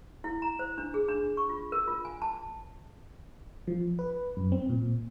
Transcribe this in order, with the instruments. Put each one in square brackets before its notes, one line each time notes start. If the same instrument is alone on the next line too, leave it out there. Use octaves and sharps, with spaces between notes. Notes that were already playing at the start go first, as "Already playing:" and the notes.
[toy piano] E4
A#5
C5
D4
G#4
D4
C#6
F4
A#4
F4
G#5
A5
[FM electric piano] F3
B4
F#2
C4
A#2